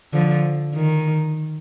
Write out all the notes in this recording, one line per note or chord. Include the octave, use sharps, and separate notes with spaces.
D3 F3
D#3